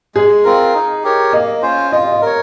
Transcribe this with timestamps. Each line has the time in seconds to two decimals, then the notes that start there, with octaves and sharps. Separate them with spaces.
0.15 G#3 G#4
0.44 C4 F4 A#4
0.74 D#4
1.04 G4 A#4 C#5
1.33 A#3 D#5
1.62 C#4 F4 C5
1.92 F4 D#5
2.12 D#5
2.22 A#4 C#5